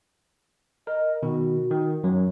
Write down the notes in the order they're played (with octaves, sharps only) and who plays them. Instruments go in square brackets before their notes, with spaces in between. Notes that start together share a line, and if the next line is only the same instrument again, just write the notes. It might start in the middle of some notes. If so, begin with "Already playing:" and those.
[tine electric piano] A#4 [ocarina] D#5
[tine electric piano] B2 D#3 [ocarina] F#4
[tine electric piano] D#3
F#2 F#3